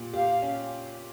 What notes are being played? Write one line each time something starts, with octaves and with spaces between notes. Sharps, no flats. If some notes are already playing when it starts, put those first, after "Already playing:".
Already playing: A#2 G4
G4 F5
C#4